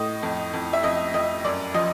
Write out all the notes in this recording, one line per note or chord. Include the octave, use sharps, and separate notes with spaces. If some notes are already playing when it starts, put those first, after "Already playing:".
Already playing: A2 D#5
F2
F2
E5
F2 D#5
F2 D#5
F#2 D5
F3 D#5